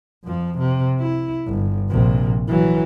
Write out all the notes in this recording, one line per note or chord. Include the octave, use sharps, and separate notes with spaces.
F2 F3
C3
E4
G1
A#1 C3
E3 F#3